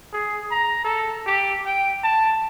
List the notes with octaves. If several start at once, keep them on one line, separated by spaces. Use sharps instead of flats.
G#4
A#5
A4
G4
G5
A5